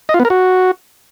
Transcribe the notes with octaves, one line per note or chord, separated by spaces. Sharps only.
D#5
F4
B3
A#4
F#4